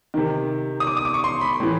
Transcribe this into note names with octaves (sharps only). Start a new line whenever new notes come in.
C3 D#3
D#6
D6
D#6
D6
C#6
C6
B5
A2 E3